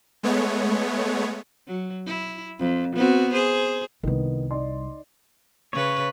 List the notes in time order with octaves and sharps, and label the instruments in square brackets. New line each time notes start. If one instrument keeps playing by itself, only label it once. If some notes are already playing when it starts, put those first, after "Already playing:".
[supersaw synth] G#3 A3 B3 C#5
[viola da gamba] F#3
E4
F2
B3 C4 F#4
G#4 C5
[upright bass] C2 G3 [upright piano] D#3 B3
[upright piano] D#4 D5 C6
[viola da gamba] C#3 B4 [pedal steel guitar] C#5